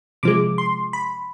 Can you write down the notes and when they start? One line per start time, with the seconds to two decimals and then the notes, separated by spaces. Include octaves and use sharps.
0.23 C3 F3 G#3 D6
0.58 C6
0.93 B5